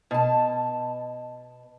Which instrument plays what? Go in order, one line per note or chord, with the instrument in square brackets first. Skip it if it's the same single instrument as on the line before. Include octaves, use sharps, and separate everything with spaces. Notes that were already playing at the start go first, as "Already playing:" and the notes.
[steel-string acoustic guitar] B2 A5